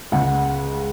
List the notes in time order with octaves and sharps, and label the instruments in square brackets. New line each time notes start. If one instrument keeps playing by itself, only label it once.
[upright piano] C#2 C#3 G#3 F#5